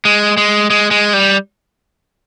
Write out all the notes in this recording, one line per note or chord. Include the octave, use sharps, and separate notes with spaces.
G#3
G#3
G#3
G#3
G3